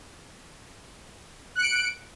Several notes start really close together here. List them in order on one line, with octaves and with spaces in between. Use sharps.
F#6 C#7 D7